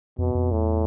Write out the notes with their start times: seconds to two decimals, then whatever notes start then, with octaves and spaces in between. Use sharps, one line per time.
0.18 F2 B2
0.35 F2
0.52 E2 A2